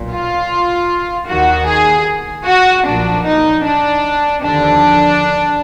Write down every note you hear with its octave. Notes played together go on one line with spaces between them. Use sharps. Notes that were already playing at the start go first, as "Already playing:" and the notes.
Already playing: B1 A#2
F4
D#2 D#3 F#4
G#4
F#4
B1 A#2 F3 D4
D#4
D4
D#2 D3 F3 D4